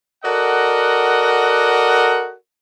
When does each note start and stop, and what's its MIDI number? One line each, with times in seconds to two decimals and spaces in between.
0.24 2.33 66
0.24 2.33 69
0.24 2.33 70
0.24 2.33 74
0.24 2.33 75
0.24 2.33 78